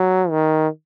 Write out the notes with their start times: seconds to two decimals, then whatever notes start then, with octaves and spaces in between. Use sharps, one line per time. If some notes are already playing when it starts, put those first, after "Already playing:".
Already playing: F#3
0.30 D#3